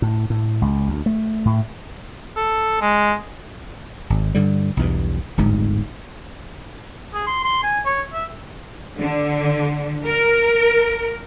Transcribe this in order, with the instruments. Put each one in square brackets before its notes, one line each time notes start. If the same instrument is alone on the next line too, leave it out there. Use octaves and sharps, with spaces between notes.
[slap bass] A2
A2
C#2
D2
A3
A2
[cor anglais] A4
G#3
[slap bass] G#1
G2 D3 G3
B1 E2 G2
D1 G1 F2 G#2
[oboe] G#4
C6
C6
G#5
C#5
E5
[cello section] D3
A#4